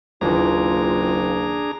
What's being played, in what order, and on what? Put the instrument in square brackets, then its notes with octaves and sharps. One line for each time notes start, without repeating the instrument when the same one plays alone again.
[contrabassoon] F#1 [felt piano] D#2 E3 [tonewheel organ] D4 G#4 A#5 [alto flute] F4